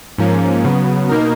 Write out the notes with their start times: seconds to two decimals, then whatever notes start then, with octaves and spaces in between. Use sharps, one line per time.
0.18 G#2 F3 A#3 C#4
0.64 C#3 F#3 B3
1.09 B2 A#3 D#4 A#4